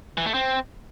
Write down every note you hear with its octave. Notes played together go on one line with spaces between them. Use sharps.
E3
A3
C4